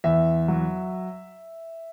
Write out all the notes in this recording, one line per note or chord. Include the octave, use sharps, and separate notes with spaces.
E2 E5
F#3